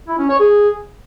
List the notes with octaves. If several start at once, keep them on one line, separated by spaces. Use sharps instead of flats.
E4
C#4
C#5
G#4